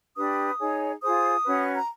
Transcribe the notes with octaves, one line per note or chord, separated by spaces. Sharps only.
D4 G4 B4 D#6
D#4 G#4 C#5
F4 G#4 C5 D#6
C#4 F#4 B4
A#5